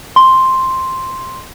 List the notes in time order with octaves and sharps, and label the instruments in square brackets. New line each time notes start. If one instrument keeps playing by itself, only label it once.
[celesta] C6